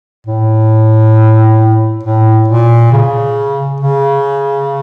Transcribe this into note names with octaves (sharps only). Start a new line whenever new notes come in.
A2
A2
A#2
C#3
C#3